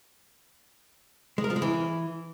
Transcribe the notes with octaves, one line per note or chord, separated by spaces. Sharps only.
G#3
A#4
F3
G#3
E3